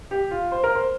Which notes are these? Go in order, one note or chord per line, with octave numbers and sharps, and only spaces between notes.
G4
F4
C5
A#4
C5